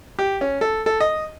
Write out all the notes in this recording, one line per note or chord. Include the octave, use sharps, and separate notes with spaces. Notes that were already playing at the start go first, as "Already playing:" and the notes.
G4
C#4
A4
A4
D#5